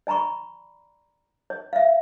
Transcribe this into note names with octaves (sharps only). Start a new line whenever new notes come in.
D5 G#5 A#5 B5 C#6
C#5
E5 F5